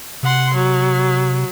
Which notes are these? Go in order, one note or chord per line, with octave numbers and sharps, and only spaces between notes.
C3 F#5 C6
F#3